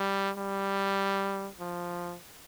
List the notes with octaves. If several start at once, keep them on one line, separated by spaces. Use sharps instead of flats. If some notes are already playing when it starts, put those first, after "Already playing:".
Already playing: G3
G3
F3